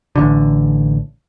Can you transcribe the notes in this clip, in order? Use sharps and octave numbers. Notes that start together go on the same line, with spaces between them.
A1 D3